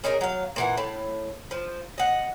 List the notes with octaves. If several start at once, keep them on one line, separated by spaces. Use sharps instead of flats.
C#4 D#4 G#4 A#4
F#3 F5
A#2 E3 F#5
A2 A5
F3
D#5 F#5